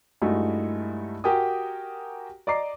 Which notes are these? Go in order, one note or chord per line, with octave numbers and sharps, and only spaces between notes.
G2 G#3 A3 D#4 E4 F#4
F#4 G4 A#4 G5 G#5 D#6
D5 D#5 A#5 D6 C7